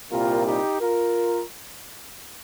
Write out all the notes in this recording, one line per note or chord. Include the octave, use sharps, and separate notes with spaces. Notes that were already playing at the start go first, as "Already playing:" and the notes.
C2 A#2 G3 F4 A#4
D#4 G4
F4 A#4